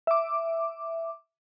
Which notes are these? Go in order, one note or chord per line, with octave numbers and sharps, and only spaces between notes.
E5 D6